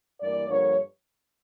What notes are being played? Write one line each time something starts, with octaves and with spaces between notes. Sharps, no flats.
G2 E3 A#3 D5
G2 D3 F3 A#3 C#5